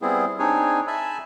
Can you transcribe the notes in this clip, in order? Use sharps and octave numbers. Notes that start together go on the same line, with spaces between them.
G3 B3 C4 E4 G#4
C4 D4 D#4 G#4 C#5 G#5
E5 G#5 A5 B5 E6